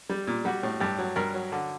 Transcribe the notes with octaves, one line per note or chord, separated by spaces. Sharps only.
G3
A#2
G3 F#4
A2
G2 G4
F#3
G2 A#4
F#3
D3